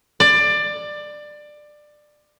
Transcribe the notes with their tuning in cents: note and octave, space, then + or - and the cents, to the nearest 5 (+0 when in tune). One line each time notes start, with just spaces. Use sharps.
D5 +20